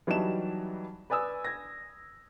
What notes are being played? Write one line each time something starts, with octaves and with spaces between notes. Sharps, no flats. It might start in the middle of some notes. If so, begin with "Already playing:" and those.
E3 F#3 G3 D#4 A5 E7
B4 D5 G#5 D#6 E6
G#6 A#6